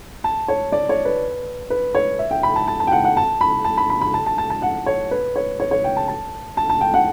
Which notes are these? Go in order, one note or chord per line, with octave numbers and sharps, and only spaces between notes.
A5
C#5
D5
C#5
B4
B4
C#5
E5
G5
B5
A5
A5
A5
G5
F#5
F#5
A5
B5
A5
B5
B5
B5
A5
A5
A5
A5
F#5
C#5
B4
C#5
C#5
C#5
G5
A5
A5
A5
A5
G5
F#5